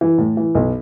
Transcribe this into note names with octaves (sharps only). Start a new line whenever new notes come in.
E3
A2
E3
B1